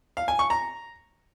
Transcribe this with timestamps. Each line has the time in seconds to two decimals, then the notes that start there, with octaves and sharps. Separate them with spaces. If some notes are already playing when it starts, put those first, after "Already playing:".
0.17 F5
0.28 G#5
0.39 C#6
0.50 A#5